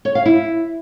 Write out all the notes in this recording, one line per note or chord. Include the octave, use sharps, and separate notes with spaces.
C#5
F5
E4